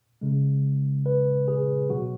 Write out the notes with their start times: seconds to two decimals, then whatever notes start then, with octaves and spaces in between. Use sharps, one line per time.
0.21 C#3 G#3
1.06 B4
1.48 G#4
1.90 B2 F#3 F#4